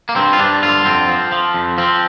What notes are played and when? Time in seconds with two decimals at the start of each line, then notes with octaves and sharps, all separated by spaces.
0.09 A#3
0.16 G2 C4
0.33 F4
0.39 G2 D4
0.62 D3 F4
0.85 F2 C4
1.08 F3
1.32 F3
1.54 F2
1.78 F3 C4